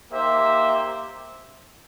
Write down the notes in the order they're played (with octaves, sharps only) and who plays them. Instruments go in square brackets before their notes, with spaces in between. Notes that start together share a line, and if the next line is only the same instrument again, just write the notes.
[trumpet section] A#3 D#4 G4 C5 E5